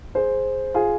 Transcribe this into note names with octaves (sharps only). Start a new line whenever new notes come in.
G#4 C5
F4 G#4